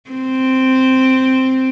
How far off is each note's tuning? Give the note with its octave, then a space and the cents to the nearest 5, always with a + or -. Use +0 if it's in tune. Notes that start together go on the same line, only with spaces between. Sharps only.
C4 -5